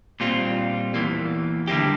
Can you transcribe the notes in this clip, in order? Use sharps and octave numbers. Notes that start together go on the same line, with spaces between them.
A#2 G3 C4 F4
E2 E3 A#3
D3 G3 A#3 E4 G4